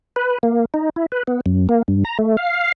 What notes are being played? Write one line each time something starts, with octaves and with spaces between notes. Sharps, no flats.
B4
A#3
D#4
E4
B4
B3
F#2
A#3
G2
A#5
A3
F5